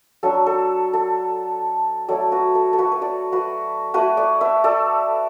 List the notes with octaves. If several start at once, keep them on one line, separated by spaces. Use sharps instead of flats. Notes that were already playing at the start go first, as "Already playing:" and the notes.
F#3 D4 A4
A4
A4
F#3 A3 E4 A4 D5
F#4 B4
A4
A4
F#4 B4
B4
A4 D5
F#4 B4
A3 E4 F#4 B4
A4 D5
B4 E5
A4 D5